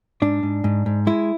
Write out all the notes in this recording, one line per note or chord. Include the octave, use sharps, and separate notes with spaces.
G#2 D4
G#2
G#2
G#2
G#3 E4